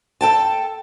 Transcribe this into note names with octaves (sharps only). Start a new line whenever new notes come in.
A4 G5 A5